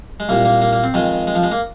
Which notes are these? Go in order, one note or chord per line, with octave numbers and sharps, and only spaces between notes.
G#3
C2 A#2 A#3
A#3
A#3
A#3
C4
F2 D#3 G#3
G#3
F3
G#3
A#3